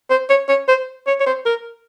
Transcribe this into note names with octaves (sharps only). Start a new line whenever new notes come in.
C5
C#5
C#5
C5
C#5
C#5
C5
A#4